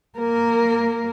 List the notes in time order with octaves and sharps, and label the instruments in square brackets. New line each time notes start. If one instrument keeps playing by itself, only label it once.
[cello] A#3 A#4